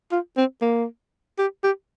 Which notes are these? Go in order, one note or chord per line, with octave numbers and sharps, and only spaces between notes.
F4
C4
A#3
G4
G4